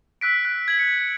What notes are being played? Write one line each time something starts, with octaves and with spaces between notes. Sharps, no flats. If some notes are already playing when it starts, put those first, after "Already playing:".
E6 F#6 B6 D7
F#6
G#6 F#7
C#7